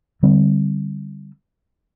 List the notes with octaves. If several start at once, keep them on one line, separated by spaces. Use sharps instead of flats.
D3 G3 C4